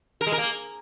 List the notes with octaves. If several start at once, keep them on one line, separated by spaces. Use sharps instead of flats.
A#4
G#3
A#4
A#3